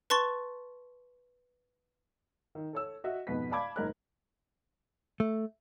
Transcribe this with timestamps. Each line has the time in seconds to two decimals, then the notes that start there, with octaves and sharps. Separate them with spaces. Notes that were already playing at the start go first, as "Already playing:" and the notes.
0.10 B4 A5 C6 C#6 A6
2.55 D#3
2.73 A4 C#5 E6
3.04 F#4 D#5 E5
3.27 F2 G#2 B2 B3 B4 B6
3.51 D5 F5 A5 B5 D6 G#6
3.76 F#1 G#2 A#4 F#6
5.20 A3